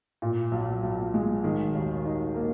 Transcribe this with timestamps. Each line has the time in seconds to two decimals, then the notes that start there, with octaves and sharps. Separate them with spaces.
0.22 A#2
0.52 B1
0.83 B1
1.14 G#3
1.44 D#3
1.74 D#2
2.05 D#4
2.36 A#3